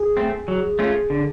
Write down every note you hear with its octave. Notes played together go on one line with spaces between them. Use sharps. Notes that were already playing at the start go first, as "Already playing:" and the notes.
Already playing: G#4
A3 C4
F#3
A3 C#4 F4
D3